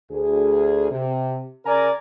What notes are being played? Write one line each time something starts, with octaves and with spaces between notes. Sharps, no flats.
D2 G#4
C3
C#3 A#4 D5 G#5 A#5